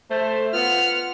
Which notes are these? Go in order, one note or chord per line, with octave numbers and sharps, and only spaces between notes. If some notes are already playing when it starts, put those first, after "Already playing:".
A3 C5
B3 F4 F#5 F6